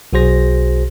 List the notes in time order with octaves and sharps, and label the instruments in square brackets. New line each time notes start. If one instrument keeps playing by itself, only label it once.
[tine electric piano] B1 F#4 G#4 C5 A#6